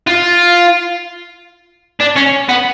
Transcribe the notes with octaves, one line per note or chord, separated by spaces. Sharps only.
F4
D4
C#4
B3